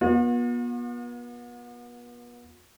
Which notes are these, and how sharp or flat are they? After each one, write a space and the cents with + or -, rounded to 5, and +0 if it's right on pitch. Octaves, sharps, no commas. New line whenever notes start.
B3 -40 F4 +45